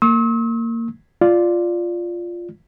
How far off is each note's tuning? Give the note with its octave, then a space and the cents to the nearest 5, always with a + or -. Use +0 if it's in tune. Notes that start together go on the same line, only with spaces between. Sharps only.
A#3 -25 C#6 -45 E6 -40
F4 +0 D5 +0